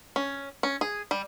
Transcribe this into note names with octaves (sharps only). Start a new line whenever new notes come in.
C#4
C#4
G#4
G3